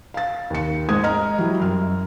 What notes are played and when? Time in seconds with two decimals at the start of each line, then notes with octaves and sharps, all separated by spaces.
0.14 F5 A6
0.50 D#2 C#7
0.89 G#2 G#3 D#6 G#6
1.03 D#5 A#5 F6
1.38 F#3 G3 E4
1.60 F#2 F6